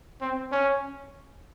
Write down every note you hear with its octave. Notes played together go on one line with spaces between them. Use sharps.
C4
C#4